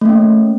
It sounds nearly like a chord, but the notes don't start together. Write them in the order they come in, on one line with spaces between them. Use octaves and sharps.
A3 A#3 C#4